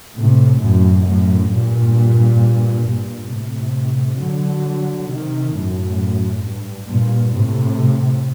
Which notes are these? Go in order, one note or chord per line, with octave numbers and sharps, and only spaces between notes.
A2 C3
F#2 A2
F#2 A2
G2 A#2
G2 A#2
A2 C3
D3 F#3
C3 D#3
F#2 A2
G2
G2 A#2
A2 C3